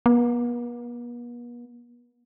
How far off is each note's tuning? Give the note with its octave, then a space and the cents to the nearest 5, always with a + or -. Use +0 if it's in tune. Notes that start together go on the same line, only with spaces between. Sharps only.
B3 -45